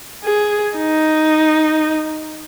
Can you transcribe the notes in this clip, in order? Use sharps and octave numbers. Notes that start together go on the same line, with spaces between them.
G#4
D#4